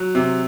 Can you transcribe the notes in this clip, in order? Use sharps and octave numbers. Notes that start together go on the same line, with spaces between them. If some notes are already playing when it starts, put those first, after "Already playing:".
Already playing: F#3
C3